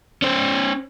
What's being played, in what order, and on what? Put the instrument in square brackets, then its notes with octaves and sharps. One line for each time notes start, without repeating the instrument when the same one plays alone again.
[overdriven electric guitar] C#4 C5